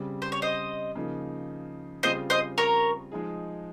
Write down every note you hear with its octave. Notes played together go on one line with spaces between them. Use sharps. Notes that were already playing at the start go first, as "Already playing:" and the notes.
Already playing: C#3 G3 C4
C5
C#5
C5 D#5
C#3 F3 A#3 D#4
C#3 G3 C4 F4 G#4 C5 D#5
C5 D#5
A#4 C#5
F3 G#3 D#4 G#4